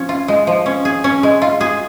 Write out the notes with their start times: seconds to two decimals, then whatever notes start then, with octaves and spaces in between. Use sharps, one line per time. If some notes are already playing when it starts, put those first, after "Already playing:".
Already playing: F3 C#4
0.09 F4
0.28 G#3
0.47 F3
0.66 C#4
0.85 G#4
1.04 C#4
1.23 G#3
1.42 F4
1.61 G#4